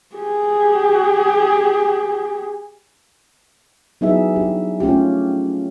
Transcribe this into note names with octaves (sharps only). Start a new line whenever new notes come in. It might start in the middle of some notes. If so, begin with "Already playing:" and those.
G4 G#4
F#3 B3 D#4 E4 G#4 E5
D4 G4
A3 C#4 F4 G4